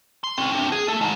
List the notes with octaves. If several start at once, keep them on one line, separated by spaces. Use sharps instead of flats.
C6
C4 C#4
C4 D4
G#4
A3 A4
G#2 D#3